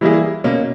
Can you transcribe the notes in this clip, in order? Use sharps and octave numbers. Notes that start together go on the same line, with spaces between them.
E3 G3 A#3 E4 G#4
B2 A#3 C#4